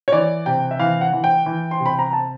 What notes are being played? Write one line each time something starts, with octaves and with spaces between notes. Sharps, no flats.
C#5
E3 D5
C3 G5
E5
E3 F5
F#5
E3
G5
E3
C6
C3
B5
A#5
A5